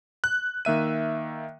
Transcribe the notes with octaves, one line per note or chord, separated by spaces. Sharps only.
F#6
D#3 A#3 E5 D#7